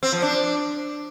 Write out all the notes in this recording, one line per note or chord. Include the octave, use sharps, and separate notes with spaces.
C4
F3
D4